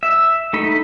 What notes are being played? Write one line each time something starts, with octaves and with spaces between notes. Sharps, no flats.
E5
A3 D#4 B5